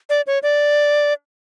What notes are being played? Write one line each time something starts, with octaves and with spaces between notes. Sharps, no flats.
D5
C#5
D5